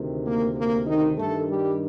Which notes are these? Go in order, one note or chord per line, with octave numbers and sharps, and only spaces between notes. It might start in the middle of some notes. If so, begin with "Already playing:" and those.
Already playing: D2 C3 D#3
A#3
A#3
D#3 D#4
G2 D#3 A3 A4
G3 G4